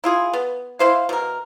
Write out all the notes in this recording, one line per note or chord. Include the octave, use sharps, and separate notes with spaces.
E4 F4 G#4
B3
E4 C5 F5
B2 A#4